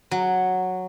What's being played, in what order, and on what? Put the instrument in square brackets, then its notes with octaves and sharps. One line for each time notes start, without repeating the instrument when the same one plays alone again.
[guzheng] F#3